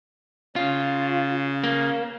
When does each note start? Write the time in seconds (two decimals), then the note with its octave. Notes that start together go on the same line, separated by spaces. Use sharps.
0.56 C#3 F4
1.64 A#3